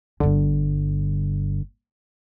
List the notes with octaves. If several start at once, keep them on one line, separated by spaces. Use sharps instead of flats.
G1 G2 D3